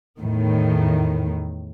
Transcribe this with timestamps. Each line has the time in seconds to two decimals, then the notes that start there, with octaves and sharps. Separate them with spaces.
0.20 E2 A2 D#3